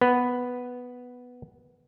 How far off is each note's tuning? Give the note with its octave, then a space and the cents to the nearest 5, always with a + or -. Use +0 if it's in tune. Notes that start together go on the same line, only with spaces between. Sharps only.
B3 +0 B4 +0